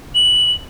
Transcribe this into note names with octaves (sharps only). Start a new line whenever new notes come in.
F#7